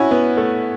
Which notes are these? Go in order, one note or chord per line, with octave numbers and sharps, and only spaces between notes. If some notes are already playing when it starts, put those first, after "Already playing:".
Already playing: C#4 E4 F#4
B3
A3